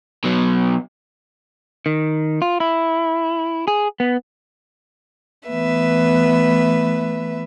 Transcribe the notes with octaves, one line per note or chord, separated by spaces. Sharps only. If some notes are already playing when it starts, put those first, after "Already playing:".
B2 F#3
D#3
F4
E4
G#4
B3
E3 A3 B3 B4 E5